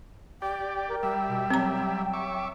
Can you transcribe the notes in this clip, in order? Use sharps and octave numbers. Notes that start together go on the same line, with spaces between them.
G4 D5 G5
A#4
G3 E5 G5
B2
F#3 C4 A#5
E5 C#6 D6